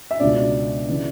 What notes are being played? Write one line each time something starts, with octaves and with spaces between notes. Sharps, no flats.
E5
C#2 B2 D4 D5
C#3 E3